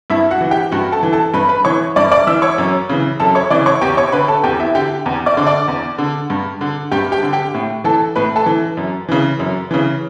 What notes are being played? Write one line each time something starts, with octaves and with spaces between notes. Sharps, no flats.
G2 E4 E5
F#4 F#5
E3
G4 G5
G2 F#4 F#5
A4 A5
E3
A4 A5
G2 B4 B5
B4 B5
E3 C#5 C#6
G2 D5 D6
D5 D6
E3 E5 E6
C#5 C#6
F#2
C#3 E3
F#2 A4 A5
C#5 C#6
C#3 E3 D5 D6
C#5 C#6
E2 G4 G5
C#5 C#6
D3 B4 B5
A4 A5
E2 G4 G5
E4 E5
D3 G4 G5
E2
D5 D6
D3
D5 D6
E2
D3
G2
D3
G2 G4 G5
G4 G5
D3
G4 G5
A2
E3 A4 A5
A2 B4 B5
A4 A5
E3
F#2
C#3 E3
F#2
C#3 E3